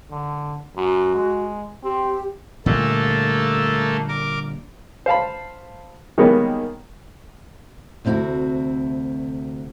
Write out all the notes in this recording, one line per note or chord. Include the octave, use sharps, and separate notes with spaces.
D3
F#2 F#4
G#3
C4 G4
A#2 D3 G3 A3 A#3 A4
A#4 D6
C5 F5 A5 B5
D#3 G3 G#3 A#3 B3 C#5
D2 C3 C4 D#4 E4 F#4